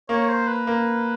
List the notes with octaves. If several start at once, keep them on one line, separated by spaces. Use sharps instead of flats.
A#3 C#5
C5
B4
A#3